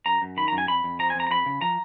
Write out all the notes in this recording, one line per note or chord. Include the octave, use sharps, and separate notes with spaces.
F#2 A#5
F#2
D#3 B5
A#5
F#2
G#5
F2 B5
F2
F3 A#5
G#5
F2 A#5
A#5
F2 B5
C#3
F3 A#5